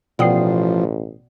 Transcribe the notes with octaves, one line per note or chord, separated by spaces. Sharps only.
A1 B2 F3 D5 F#5 G5 D#6 C7